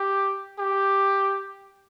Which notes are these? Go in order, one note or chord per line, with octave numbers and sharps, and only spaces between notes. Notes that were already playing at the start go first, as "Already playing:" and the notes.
Already playing: G4
G4